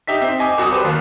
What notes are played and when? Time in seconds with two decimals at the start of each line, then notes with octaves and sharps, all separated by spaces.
0.07 D#4 G4 E5 B6
0.22 C4
0.39 D#5 G#5 D6
0.58 C2 F#4 D6 D#6
0.72 G4 B4 C5
0.85 D#2